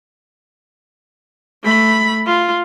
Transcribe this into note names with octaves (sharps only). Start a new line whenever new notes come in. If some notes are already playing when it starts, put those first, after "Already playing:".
A3 B5
F4